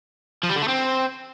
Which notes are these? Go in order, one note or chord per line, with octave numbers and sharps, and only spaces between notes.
F3
G3
D3
A3
C4